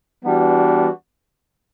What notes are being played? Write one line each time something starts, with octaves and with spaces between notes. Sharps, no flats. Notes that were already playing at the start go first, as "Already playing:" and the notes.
E3 G3 B3 D4 F#4